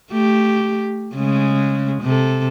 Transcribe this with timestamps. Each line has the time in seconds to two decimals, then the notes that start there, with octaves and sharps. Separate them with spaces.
0.11 A3 G4
1.14 C#3 G#3
2.03 C3 A4